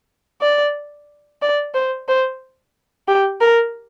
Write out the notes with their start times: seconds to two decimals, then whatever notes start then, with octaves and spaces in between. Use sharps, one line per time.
0.41 D5
1.42 D5
1.74 C5
2.08 C5
3.08 G4
3.41 A#4